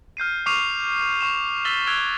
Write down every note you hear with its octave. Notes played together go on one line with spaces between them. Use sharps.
F6 G6 C7 D#7
C#6 D6 F6 C7 D#7 F7
C#6 E7
E6 A6 B6 F#7 G7
E6 F#6 G#6 D7 F7 G7